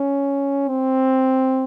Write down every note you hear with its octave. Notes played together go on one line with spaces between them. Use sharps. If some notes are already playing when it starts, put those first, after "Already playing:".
Already playing: C#4
C4